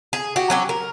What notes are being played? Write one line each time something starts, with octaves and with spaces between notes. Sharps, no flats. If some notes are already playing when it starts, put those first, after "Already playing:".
G#4
F#4 G4
F#3 C#4 G4
A#4